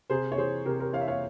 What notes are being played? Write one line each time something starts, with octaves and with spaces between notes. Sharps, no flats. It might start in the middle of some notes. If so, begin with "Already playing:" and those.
C3 G#4 C5
C#5
E3 G#4 C5
C3 G4 A#4
G4 A#4
E3 C#5 F5
E5
C#5 F5